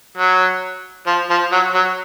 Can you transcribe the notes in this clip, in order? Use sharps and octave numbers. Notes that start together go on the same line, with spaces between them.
F#3
F3
F3
F#3
F#3